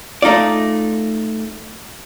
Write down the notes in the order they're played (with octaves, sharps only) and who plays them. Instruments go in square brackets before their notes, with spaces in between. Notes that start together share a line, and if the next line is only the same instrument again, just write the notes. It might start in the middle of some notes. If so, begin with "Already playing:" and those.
[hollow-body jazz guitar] A3 D#4 F4 D5